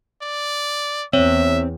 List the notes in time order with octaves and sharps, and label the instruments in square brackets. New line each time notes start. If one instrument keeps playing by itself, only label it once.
[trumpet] D5
[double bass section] E2 [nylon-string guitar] C4 [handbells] C#5 [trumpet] E5